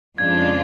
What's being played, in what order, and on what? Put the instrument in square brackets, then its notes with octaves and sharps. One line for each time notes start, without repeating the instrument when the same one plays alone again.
[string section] F2 C#3 G#3 D4 F4 [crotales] G#6